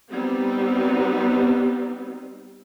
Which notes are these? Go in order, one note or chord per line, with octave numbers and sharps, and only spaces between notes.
G3 B3 C4 D#4